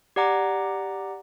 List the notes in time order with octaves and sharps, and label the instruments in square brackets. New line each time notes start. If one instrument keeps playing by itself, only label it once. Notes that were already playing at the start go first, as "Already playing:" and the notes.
[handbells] G4 D5 F#5 A#5 D6